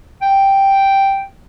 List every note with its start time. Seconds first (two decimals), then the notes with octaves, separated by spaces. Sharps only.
0.22 G5